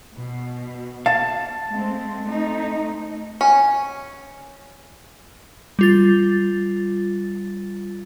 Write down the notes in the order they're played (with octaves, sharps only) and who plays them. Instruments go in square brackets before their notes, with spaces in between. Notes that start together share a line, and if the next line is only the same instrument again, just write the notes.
[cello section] B2
[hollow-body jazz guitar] F5 [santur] A5
[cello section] G#3 A3 C4
A3 C4 D#4
[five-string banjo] C#4
[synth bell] G3 F4 A6